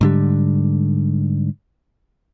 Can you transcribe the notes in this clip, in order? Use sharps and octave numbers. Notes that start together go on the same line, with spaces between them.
G#2 D3 G3